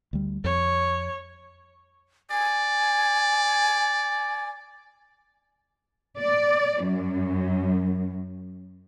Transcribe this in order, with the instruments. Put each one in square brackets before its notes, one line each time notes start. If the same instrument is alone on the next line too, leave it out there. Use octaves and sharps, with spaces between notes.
[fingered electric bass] D2 G3
[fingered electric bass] F2 [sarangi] C#5
[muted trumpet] D5 [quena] G#5
[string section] D5
F#2